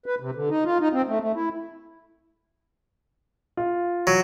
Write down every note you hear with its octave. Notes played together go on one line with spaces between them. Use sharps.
B4
C3
D3
D#4
F4
D#4
C4
A3
A3
E4
F4
F#3